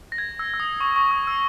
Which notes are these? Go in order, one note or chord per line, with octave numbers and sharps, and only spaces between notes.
A#6
G#6
E6
E6
D#6
C#6
C#6
D#6
E6